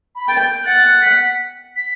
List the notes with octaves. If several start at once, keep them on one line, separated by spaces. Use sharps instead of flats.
B5
G5 A6
G6
F#5 A6
B6
B6